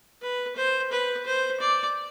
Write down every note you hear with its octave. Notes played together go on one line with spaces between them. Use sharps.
B4
C5
B4
C5
D5